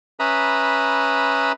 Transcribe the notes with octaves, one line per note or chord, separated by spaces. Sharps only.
C#4 B4 E5 A#5 B5 D#6